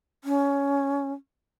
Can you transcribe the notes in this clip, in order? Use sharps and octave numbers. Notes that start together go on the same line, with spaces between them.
C#4